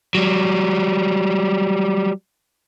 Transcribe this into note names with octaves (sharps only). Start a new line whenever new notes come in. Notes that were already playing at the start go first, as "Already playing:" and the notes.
F#3 G3